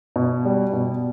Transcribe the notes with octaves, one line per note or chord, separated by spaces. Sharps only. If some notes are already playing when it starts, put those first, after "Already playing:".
B2
G3
B2